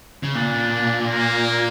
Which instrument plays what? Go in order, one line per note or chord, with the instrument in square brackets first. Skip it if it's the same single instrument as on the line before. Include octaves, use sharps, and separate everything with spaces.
[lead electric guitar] C#3
[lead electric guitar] A#2 [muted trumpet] D4
[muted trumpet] A#3